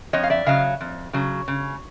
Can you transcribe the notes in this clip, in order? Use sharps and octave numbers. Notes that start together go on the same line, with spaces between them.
F2 C#5 D#5
F5
D5 E5
C#3 F#3 D#5 F5
F2
C#3 F#3
C#3